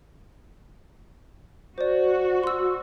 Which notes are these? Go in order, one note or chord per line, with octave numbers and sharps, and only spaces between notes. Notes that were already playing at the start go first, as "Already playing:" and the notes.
F#4 C5 D5
C6 E6